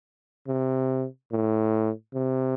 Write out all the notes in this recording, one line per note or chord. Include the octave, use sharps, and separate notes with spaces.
C3
A2
C3